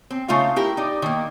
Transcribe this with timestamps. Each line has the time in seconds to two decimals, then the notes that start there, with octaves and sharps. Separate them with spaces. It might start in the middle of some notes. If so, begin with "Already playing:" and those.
0.10 C4
0.28 C#3 A3 D#4 F4 F5
0.56 E4 G4 A#4
0.77 D#4 D5
1.02 D#3 A#3